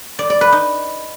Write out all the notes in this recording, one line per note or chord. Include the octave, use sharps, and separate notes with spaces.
D5
D5
B4
D#4